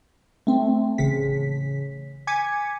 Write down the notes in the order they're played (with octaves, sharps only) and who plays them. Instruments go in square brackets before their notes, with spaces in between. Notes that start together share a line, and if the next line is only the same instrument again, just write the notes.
[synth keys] A3 C4
A1 C#3 B6
G#5 D6 G#6 B6 C#7